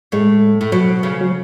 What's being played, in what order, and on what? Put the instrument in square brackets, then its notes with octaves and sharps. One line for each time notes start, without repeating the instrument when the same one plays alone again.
[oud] A2 [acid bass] G#3
[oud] A2
[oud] B2 [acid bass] F#3
[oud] C#3
[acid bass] F#3